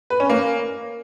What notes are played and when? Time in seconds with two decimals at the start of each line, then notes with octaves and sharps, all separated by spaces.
0.10 B4
0.20 C#4
0.29 A#3